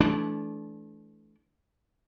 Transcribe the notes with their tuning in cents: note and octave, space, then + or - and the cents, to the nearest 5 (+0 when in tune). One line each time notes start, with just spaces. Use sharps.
E3 -10 A3 -35 D4 -20